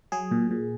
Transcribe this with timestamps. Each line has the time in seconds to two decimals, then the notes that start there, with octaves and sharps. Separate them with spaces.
0.12 F#3 G#4
0.31 A#2
0.51 A#2